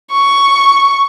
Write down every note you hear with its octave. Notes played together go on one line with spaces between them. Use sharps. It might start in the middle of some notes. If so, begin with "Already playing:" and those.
C#6